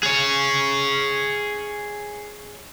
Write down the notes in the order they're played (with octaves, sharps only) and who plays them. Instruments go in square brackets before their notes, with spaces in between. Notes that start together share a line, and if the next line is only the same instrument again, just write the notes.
[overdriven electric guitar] G#4 C#5